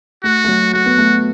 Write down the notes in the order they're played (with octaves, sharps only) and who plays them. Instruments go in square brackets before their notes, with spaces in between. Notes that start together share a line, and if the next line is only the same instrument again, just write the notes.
[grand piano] A3 [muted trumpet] F#4
[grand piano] A3
F#3
[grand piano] A3 [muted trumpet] F#4
[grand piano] B3
A3